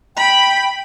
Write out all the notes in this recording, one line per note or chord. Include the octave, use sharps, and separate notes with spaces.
G5 B5